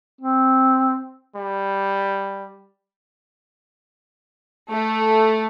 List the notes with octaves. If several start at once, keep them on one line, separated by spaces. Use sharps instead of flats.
C4
G3
A3